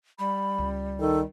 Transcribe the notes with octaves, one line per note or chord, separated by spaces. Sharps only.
G3 B5
C#2
D#3 A4